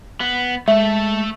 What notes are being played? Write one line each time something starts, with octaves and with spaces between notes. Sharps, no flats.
B3
G#3 A3 A4 E5